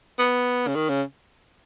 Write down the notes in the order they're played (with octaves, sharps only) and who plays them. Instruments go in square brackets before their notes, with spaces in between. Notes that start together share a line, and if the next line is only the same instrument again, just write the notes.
[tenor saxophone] B3
C#3
D#3
C#3